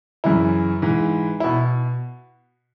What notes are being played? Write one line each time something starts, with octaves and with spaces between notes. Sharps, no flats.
F#2 C#3 E3 E4
G#2 E3
B2 E4